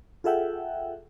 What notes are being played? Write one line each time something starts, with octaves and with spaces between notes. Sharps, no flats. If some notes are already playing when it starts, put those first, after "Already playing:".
F4 G#4 A4 E5 F#5 G5